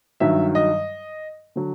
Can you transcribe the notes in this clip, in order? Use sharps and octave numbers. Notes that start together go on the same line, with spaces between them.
G2 D#3 F#3 E5
D#5
D3 F#3